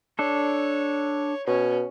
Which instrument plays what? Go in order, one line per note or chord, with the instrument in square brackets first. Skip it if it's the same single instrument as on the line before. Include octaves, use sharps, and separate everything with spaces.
[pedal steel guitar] D4 A4 [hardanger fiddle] C#5
[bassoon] B2 [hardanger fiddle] C#4